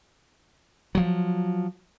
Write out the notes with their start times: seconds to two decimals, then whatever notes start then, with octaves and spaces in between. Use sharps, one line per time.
0.95 F3 F#3